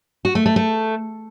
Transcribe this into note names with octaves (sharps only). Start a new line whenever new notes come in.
F#4
A3
A3
A3